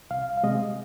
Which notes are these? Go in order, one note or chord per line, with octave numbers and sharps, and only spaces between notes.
C2 F5
F5
C3 G#3 D#5